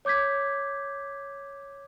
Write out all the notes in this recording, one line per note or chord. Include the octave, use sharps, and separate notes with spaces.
C#5 D6 G6 G#6 B6